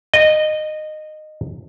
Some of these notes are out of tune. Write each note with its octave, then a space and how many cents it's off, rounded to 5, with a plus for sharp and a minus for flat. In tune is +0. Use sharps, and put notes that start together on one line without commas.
D#5 -15